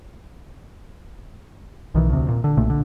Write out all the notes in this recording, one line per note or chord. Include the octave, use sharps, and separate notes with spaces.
B1 D#3 E3
D2 C3
A#2
D3
B1 A#2 A3
D3